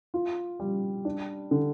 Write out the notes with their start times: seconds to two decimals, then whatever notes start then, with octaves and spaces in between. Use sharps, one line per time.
0.14 F4
0.60 G3
1.05 D4
1.51 D3